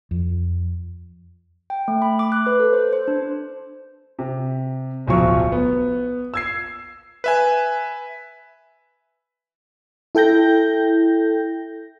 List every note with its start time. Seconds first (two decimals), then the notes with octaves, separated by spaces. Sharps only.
0.11 F2
1.70 G5
1.88 A3
2.02 B5
2.19 D6
2.32 F#6
2.46 B4
2.59 A4
2.73 C5
2.93 C5
3.08 D4
4.19 C3
5.07 D1 B1 F3 F#3 C#6
5.52 B3
6.34 E6 G#6 C7
7.24 B4 E5 G#5
10.15 E4 A4 G5 G6 A#6